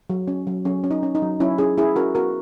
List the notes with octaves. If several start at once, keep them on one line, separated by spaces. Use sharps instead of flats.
F#3
C#4
F#3
F#3 C#4
C#4
D#4
C#4
D#4
F#3
F#3 C#4 E4
C#4 E4 G#4
C#4 E4 G#4
C#4 F#4 A#4
B3 F#4 A#4